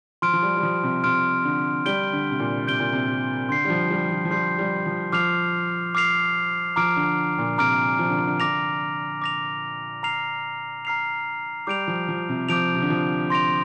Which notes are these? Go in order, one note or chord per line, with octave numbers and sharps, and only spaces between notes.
F3 C6 F6 D7
F3
G3
G3
F3
C3
C3 C6 F6 D7
D3
G3 G6 D7 G7
D3
C3
A#2
C3 G6 D7 G7
A#2
C3
C3
D3 C6 G6 C7
G3
F3
G3
F3
F3
G3 C6 G6 C7
G3
F3
F3 D6 F6 C7 F7
D6 F6 C7 F7
F3 A#5 D6 F6 D7
D3
A#2
C3 A#5 D6 F6 D7
F3
D3
C3
D3
D3 D6 A#6 F7
D6 A#6 F7
A#5 F6 C7 F7
A#5 F6 C7 F7
G3 D6 G6 D7 F7
F3
F3
C3
F3 D6 G6 D7 F7
C3
D3
F3
C6 A#6 D7 F7